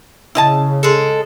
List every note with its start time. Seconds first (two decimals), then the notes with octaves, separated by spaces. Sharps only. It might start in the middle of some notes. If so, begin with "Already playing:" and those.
0.35 C#3 E4 D#5 A5
0.83 G#3 A4